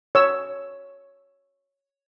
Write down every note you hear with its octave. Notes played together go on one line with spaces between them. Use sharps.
C#5 E6